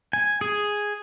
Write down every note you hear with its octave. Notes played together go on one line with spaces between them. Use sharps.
G#5
G#4